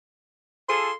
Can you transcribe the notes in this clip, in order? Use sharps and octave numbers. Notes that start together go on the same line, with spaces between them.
F4 G#4 A4 C6